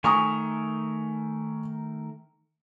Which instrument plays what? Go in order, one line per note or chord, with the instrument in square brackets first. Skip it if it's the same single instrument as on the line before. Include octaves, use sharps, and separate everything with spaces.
[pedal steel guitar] D#3 A3 A#4 [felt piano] G#5 C#6 D#6